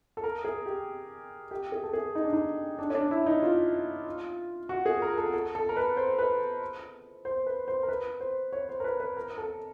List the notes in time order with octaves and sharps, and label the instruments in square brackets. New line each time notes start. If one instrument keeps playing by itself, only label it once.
[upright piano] A4
A#4
G#4
G4
G4
G#4
A4
G#4
D#4
D4
D#4
D4
C#4
D4
E4
D#4
F4
F#4
G#4
A#4
A4
A4
A4
A#4
B4
C5
B4
C5
B4
C5
A#4
B4
C5
C#5
C5
A#4
B4
B4
A#4
A4